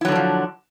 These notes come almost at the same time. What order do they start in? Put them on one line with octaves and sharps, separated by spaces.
E4 F#3 D3 D4 F3